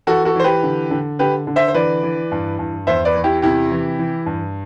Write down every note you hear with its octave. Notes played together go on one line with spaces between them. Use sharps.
E3 F#4 A4
F#4 A4
E3 C5
G4 B4
D3
D3
D3 G4 B4
D3
C5 E5
C5
E3 B4 D5
E3
G2
G2
E2 C5 E5
B4 D5
E2
E4 G4
C3 E4 G4
E3
E3
G2